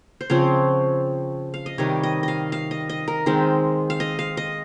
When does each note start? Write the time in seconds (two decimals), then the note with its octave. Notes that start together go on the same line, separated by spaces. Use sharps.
0.21 C5
0.30 C#3 F3 C4 C#5
1.54 F5
1.66 D#5
1.78 C3 D#3 G3 C#5
2.03 D#5
2.23 D#5 F5
2.52 F5
2.71 D#5
2.89 D#5
3.08 A#4
3.26 D#3 G#3 C4
3.90 F5
4.00 D#5
4.19 F5
4.37 D#5